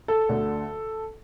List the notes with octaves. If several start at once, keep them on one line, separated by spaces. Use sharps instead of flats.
A4
D2 D3